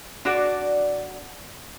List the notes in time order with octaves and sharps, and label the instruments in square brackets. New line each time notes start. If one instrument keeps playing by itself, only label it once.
[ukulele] D4 F#4 D5